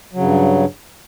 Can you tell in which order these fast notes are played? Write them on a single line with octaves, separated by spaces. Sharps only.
F#3 C#3 G2